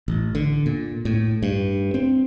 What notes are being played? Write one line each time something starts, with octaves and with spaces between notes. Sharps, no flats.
A1
D3
A#2
A2
G2
C4